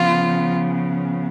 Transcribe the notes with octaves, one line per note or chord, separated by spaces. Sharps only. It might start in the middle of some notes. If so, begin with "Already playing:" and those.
Already playing: C#3 F3 B3 F4